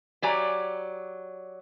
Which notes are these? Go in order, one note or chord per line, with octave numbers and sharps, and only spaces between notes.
F#3 G4 D5 G#5 A#5